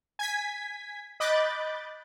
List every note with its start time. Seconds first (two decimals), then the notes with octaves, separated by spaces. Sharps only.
0.19 G#5 G#6 B6
1.20 D#5 B5 D6 F#6 G6 A6